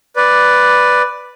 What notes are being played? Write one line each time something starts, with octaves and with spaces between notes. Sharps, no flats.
B4 D5